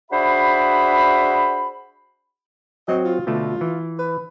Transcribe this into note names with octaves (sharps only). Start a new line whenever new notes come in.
D4 F#4 G#4 C5 E5 B5
F#3 C4 F#4 D#5
F4
B2 D3 A3 F4
E3
B4